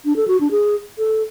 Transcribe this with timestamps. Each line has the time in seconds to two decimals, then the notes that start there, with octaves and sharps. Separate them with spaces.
0.05 D4
0.16 A4
0.28 F#4
0.40 D4
0.51 G#4
0.98 A4